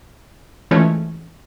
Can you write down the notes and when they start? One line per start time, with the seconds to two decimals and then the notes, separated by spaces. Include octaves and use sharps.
0.71 E3 F3 G#3 A3 C#4